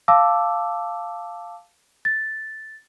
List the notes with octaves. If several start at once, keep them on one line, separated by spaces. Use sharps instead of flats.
F5 A5 D6 E6
A6